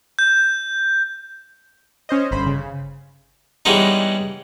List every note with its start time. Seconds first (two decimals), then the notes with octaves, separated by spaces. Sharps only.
0.19 G6
2.09 C#4 C5 D#5
2.31 G1 C5 B5
2.46 C#3
3.65 E3 G3 G#3 B3 C#4 D#4